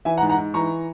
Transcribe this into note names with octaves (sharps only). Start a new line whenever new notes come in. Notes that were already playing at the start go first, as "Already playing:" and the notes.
E3 E5 G#5
F#5 A#5
G#2
F#5 A#5
G#2
E3 A#5 C#6